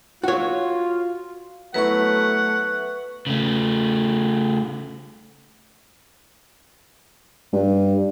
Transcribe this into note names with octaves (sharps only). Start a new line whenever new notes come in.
F4 F#4 C#5
F#3 A3 B3 E4 B4 F#5 C#6
C#3 A3
G2